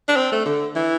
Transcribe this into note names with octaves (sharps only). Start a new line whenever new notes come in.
D4
C4
A3
D3
E3